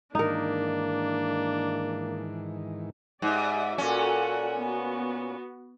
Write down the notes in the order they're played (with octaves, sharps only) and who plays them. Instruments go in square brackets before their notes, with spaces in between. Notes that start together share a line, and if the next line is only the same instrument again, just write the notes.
[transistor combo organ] G#2 D#3 E3 [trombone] A#3 [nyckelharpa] D4 [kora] D#4 A#4
[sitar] G#2 [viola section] G4 D5 E5
[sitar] A#2 C#4 [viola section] F#4 A4 F#5
[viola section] B3 F#4